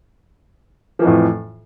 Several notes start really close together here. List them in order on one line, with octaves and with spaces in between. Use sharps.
F3 E3 F2 A2